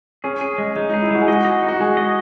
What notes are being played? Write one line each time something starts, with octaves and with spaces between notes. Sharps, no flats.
C#4 G#4
G#4
G#3
G#3 D#4
D#4 G#4
E4
G#3 F#4
G#4
F#4 D#5
D#5
D#4
F#4
G#3 G#4
D#5